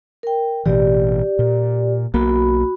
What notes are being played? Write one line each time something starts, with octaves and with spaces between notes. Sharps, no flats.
A#4 G5
A1 B2 E3 G4 D5
A#2
B1 A#3 F#4 B5